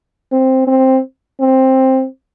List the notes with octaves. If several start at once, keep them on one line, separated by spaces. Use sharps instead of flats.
C4
C4
C4